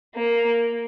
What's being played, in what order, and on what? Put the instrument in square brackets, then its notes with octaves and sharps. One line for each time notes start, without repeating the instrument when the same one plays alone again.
[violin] A#3